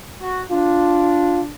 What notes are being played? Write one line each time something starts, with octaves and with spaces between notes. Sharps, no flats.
F#4
D4 F4